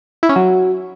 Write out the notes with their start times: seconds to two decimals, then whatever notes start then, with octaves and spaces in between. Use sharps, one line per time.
0.23 E4
0.29 C#4
0.36 F#3